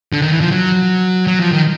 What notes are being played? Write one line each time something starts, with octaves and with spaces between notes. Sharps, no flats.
D3
D#3
E3
F3
F#3
F#3
F3
D#3